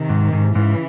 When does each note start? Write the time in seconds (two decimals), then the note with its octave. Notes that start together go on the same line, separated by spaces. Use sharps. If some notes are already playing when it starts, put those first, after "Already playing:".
Already playing: C3 D#3
0.09 G#2
0.33 G#2
0.55 G#2 C#3 E3